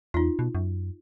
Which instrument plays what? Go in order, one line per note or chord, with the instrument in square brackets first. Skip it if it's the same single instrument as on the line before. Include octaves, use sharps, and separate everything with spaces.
[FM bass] E2 [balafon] D#4 F4
[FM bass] B2
F#2